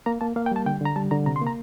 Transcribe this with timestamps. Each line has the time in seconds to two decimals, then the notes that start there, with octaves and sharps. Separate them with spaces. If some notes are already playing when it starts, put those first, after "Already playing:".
0.06 A#3 A#5
0.21 A#3 A5
0.36 A#3 F5
0.46 G5
0.51 G3 A5
0.66 D3 G5
0.81 D3 A#5
0.96 G3 A5
1.11 D3 A#5
1.26 C3 A#5
1.36 C6
1.42 A#3
1.47 A#5